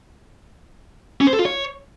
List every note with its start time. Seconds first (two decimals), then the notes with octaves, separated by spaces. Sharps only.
1.21 C#4
1.27 C5
1.33 A4
1.39 F4
1.45 C#5